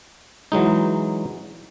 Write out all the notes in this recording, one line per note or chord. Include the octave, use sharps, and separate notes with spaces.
E3 F#3 G#3 D#4